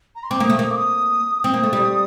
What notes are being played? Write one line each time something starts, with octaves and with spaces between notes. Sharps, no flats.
A#5
C6
C4 D6
A#3
D#6
A3
A#3 D#6
D6
D#6
C4 D#6
A#3
A3
G3